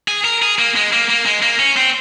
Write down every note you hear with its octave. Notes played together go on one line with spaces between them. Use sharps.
G#4
A#4
G#4
A#3
G#3
A#3
A#3
G#3
A#3
C#4
C4